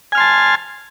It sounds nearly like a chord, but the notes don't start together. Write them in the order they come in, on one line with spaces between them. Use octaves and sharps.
G#5 F6 C6 A5